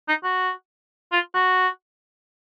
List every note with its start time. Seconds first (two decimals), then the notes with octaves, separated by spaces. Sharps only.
0.08 D#4
0.24 F#4
1.12 F4
1.34 F#4